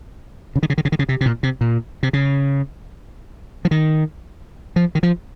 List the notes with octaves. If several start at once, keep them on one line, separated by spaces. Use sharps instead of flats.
C#3
D#3
C#3
D#3
C#3
D#3
C#3
C3
C3
A#2
C3
A#2
C3
C#3
F3
D#3
F3
D#3
F3